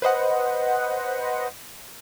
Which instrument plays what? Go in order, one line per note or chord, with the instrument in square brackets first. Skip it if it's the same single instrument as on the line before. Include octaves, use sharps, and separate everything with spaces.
[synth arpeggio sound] B4 C5 D#5 F#5